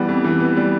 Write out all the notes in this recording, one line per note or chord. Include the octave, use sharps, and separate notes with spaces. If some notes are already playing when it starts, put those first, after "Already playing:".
Already playing: E3 G3 B3
F2
E3
B3
G3